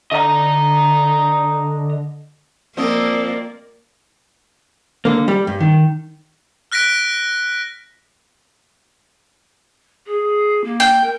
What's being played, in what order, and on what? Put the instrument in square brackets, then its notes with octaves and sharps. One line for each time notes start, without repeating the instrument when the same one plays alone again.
[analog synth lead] D3 [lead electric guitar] D#5 A#5
[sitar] F3 C4 D#5 [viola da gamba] A#3 [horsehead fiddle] A#4 D5
[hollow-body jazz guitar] D3 A#3
G3
G2
D#3
[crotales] F6 F#6 A#6 B6 D7
[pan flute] G#4
A#3
[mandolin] G5
[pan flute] A#4